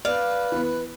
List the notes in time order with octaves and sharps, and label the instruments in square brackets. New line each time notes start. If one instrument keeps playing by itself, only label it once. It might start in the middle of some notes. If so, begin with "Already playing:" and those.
[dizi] B4 [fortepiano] D5 [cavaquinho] F5
[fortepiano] E3 B3